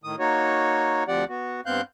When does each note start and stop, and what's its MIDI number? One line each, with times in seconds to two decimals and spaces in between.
0.04 0.16 45
0.04 0.16 51
0.04 0.16 87
0.19 1.04 58
0.19 1.04 63
0.19 1.04 66
0.19 1.04 73
1.08 1.24 38
1.08 1.24 53
1.08 1.24 60
1.08 1.24 67
1.08 1.24 74
1.08 1.24 78
1.29 1.61 59
1.29 1.61 66
1.66 1.81 43
1.66 1.81 59
1.66 1.81 60
1.66 1.81 77
1.66 1.81 90
1.66 1.81 91